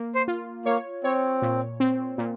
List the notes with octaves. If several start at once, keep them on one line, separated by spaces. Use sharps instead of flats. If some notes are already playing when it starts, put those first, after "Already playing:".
Already playing: A#3
C5
F4
A#3 C#5
C4 C#5
A#2
C4
A#2